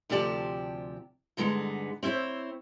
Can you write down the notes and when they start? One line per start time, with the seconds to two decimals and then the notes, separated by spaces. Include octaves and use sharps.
0.10 D2 C3 F3 G4 D5 A5
1.37 G2 D3 G#3 B3 D#4
2.03 C4 E4 G#4 C5 C#5